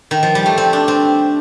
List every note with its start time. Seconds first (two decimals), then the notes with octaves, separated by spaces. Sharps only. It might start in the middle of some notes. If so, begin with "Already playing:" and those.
0.11 D#3
0.23 F3
0.35 G3
0.46 A3
0.57 C4
0.73 D4
0.88 C4